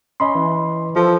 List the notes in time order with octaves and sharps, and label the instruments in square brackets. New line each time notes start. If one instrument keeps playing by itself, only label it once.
[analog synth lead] C#4 [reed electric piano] D#5 B5 C6
[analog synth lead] E3
[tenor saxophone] F3 [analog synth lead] A4